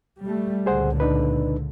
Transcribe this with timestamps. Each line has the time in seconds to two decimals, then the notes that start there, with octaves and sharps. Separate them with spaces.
0.24 G3 A3
0.66 C#2 A#2 D3 G#4 C5 F#5
1.00 D4 D#4 B4